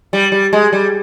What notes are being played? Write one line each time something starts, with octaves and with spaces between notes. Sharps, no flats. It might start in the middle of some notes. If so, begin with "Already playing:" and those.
G3
G3
G#3
G3